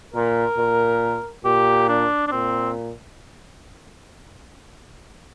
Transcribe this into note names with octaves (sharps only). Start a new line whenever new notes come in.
A#2 A#4
A#2
A#2 G4
D4
D4
A#2 C4